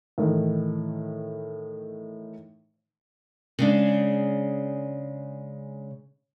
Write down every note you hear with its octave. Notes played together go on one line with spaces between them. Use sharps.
A2 D#3 E3
C#3 G#3 D4